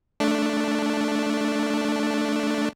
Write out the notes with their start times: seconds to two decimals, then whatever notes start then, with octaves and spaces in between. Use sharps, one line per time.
0.20 A3 D4